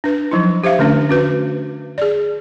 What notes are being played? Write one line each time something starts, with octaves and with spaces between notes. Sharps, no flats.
D4 B4
F3 F#3 D#4 E4
G4 C5 E5 F5
D3 A3 C#4 D4
C#4 F#4 B4
G#4 D5